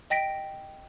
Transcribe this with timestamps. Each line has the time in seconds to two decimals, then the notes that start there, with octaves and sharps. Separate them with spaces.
0.10 D#5 G5 A#6 B6 D7